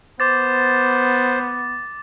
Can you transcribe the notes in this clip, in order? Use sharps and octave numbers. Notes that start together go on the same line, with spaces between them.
B3 C5 D6 A6